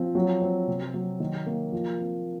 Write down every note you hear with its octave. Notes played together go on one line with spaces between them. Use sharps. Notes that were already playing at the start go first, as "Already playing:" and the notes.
Already playing: F3 C4
F#3
C4
C3
F#3
D#3
A#3
F3
C4